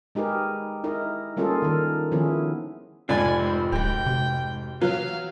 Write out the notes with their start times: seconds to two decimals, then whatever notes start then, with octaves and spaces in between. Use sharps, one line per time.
0.15 G#3 D#4 G4 G#4 A#4 B4
0.84 D#4 E4 A#4 D#5
1.37 G3 A#3 C#4 F4 G#4 A4
1.62 D#3 A#4
2.12 D#3 F3 B3 C#4 E4 G#4
3.09 F1 G#2 F4 D5 G#5 B5
3.38 C4
3.72 D1 F#4 G4 G5
4.06 C3
4.81 E2 F#3 B4 F5